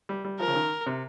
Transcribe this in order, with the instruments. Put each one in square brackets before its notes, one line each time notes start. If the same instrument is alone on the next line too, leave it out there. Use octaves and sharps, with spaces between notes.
[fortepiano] G3
G3
[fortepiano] F3 [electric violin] A#4
[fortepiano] C#3
D#3
C3